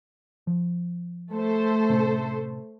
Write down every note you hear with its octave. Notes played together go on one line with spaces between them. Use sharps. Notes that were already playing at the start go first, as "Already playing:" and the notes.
F3
A3 A4 C5
A2 C3 C#4